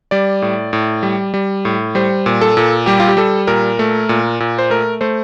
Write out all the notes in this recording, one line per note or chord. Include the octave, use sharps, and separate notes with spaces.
G3 D5
A2
A2
G3
G3
A2
G3 C5
A#2
A4
A#2
G3 G4
F4
G4
G3 A4
A#2 A#4
A3
A#2
A#2
C5
A3 A#4
A3 C5